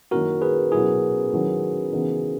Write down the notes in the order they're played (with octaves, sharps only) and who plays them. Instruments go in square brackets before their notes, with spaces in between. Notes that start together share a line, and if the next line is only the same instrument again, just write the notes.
[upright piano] F#2 D#3 A#3 C#4 E4 [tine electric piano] F#4 A#4
[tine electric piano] G#4 B4
[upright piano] B2 F#3 C#4 E4 [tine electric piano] G#4
[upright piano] D#3 F#3 C#4 E4
C#3 E3 B3 D#4